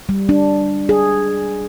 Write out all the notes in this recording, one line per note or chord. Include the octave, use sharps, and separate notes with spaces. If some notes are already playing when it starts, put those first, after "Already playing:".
G3
D4
G#4